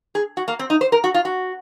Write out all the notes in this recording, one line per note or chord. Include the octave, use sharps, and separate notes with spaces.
G#4
F#4
A#3
C4
D#4
C5
A#4
F#4
F4
F#4